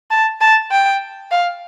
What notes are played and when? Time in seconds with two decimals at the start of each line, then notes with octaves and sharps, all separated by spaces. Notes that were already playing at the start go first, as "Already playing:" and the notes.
0.11 A5
0.41 A5
0.71 G5
1.31 F5